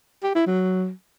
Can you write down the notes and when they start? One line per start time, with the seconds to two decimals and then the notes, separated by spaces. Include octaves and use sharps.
0.23 G4
0.35 E4
0.47 F#3